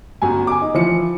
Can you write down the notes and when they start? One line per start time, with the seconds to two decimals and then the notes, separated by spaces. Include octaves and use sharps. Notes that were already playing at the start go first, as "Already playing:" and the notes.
0.22 G1 F#2 G#5
0.47 G#5 D6
0.62 D#4
0.74 E3 F3 C#7